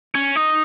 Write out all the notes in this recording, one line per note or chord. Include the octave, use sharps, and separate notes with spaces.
C#4
D#4